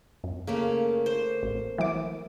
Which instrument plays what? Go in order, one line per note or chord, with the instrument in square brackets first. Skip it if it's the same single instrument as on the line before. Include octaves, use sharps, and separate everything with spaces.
[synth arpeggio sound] F#2
[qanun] C#3 A3 A#3
C5
[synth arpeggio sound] A1
E3 F#3 D6